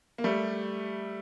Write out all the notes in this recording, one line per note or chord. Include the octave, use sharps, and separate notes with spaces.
A#3
G3 A3